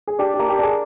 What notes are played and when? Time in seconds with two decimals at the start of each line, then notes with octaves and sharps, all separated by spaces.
0.07 G#4
0.19 D4 G4
0.34 G4
0.39 A#3
0.49 G4
0.58 D4 G#4